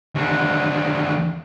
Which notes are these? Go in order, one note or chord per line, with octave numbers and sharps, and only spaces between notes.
D#2 D3